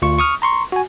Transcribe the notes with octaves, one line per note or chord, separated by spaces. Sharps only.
D2 F4 C#6
C#6 D#6 F6
A#5 C6 C#6
F#4 G#5